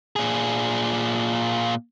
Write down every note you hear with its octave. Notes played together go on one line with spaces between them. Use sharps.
A#2 G#4